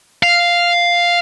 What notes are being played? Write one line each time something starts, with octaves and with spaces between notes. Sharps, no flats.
F5